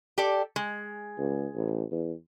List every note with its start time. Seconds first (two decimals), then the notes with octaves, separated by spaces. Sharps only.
0.18 G4 A4 D5
0.56 G#3
1.18 C#2
1.55 A1
1.91 E2